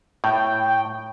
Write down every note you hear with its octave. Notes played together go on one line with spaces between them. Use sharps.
A2 G5